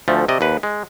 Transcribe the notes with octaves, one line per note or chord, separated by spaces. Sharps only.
D2 F3 A3
C3 D5 D#5
D#2 B4
G#3